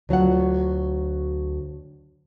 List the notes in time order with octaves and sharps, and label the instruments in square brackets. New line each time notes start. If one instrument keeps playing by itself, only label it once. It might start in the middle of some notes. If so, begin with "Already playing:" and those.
[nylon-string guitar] D2 F#3 F4 F#5